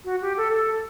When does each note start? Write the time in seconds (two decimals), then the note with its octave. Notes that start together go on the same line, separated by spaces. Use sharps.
0.05 F#4
0.22 G4
0.37 A4
0.53 A4